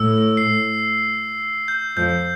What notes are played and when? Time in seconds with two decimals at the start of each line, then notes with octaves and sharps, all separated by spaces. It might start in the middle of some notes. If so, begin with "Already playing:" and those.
Already playing: A2 E6
0.37 C7
1.68 G6
1.97 F2 F3 G6